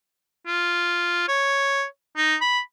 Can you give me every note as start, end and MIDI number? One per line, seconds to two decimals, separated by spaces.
0.47 1.26 65
1.28 1.84 73
2.17 2.35 63
2.41 2.60 83